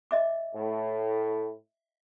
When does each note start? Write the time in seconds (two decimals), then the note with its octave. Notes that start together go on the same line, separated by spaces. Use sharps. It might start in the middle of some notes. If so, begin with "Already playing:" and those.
0.11 D#5 E5 D6
0.55 A2